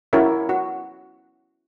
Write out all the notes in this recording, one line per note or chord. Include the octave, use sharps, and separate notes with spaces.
C#4 E4 F#4 A#4 C#5 E5
F#4